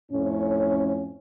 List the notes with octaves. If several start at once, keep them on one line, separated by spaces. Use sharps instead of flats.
F2 A2 C#4